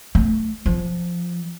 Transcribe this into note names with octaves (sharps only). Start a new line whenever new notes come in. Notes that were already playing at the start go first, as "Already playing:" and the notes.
A3
F3